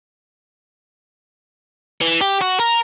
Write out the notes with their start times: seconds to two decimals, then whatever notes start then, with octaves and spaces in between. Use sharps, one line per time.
2.01 E3
2.21 G4
2.41 F#4
2.60 A#4